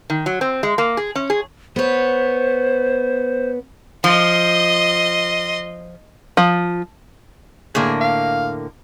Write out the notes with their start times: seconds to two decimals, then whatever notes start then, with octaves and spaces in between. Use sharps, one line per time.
0.10 D#3
0.26 F#3
0.41 C4
0.63 G#3
0.78 A#3
0.97 G#4
1.16 C#4
1.30 G#4
1.76 B3 C5 C#5
4.04 F3 D#5 C6
6.37 F3
7.75 A2 D3 A#3 G#4
8.01 F5